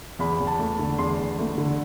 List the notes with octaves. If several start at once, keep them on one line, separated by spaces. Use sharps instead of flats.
E2 B5
E2
A5
A3
D3
E2 C6
E2
A3
D3